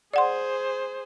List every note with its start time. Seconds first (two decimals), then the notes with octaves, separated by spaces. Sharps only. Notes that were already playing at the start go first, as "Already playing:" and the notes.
0.14 G#4 C5 D5 F#5 C6